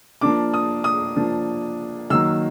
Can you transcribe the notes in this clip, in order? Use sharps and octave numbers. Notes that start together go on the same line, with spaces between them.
F3 A#3 D4 D6
D#6
D#6
F3 A#3 D4
D#3 F#3 A#3 D#4 E6